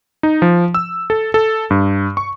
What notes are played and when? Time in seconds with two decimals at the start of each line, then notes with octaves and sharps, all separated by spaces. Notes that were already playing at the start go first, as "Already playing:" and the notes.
0.23 D#4
0.42 F3
0.74 E6
1.10 A4
1.34 A4
1.70 G2
2.17 C#6